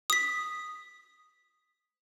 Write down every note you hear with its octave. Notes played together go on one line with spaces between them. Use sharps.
D#6 B6